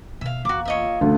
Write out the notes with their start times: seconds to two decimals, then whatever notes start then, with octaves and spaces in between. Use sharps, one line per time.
0.21 B2 E5 F5
0.45 E2 A#3 F#4 D6
0.65 F4 G#4 C#5 D#5 E5
1.01 D2 E3 A3 B3 C#4